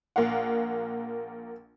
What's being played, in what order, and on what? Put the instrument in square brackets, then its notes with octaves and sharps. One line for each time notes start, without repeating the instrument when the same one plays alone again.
[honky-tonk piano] A#1 A#3 F5 F#5